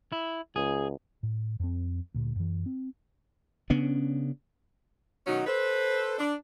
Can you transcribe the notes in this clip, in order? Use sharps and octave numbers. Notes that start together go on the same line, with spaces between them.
E4
C#2 G#4
A2
F2 C4
D2 A#2
F#2 E3
C4
C#3 B3 C#4 D4
B2 D#3 F#3 C#4 D#4 F#4
A4 B4 C5
D4